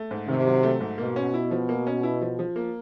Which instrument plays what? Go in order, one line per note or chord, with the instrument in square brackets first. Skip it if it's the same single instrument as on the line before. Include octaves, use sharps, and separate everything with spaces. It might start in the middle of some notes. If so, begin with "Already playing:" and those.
Already playing: [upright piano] A3
G#2
[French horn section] C3 [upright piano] D#3
[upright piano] F#3
A3
G#2
[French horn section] B2 [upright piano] A#3
[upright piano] C#4
E4
F3
A#3
C#4
E4
F3
F3
A#3